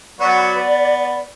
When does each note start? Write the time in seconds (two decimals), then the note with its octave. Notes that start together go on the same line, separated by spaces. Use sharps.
0.20 F#3 B3 F#4 D5
0.56 B3